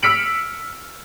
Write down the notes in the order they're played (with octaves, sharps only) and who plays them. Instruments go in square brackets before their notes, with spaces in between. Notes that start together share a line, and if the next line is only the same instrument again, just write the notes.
[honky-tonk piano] E6 F6 B6 C#7 D7 F#7